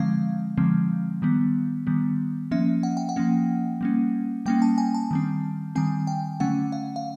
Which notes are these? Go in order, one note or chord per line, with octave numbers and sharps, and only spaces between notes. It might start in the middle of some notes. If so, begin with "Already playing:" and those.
Already playing: D3 F3 G#3 C4 F5
D3 F3 G#3 C4
D#3 G3 B3
D#3 G3 B3
F3 A#3 C#4 E5
F#5
G5
F#5
F3 A#3 C#4
G3 A#3 C#4
G3 A#3 C#4 G5
A5
G#5
A5
D#3 G3 C4
D#3 G3 C4 G#5
G5
D3 F#3 A3 C#4 F#5
F5
F5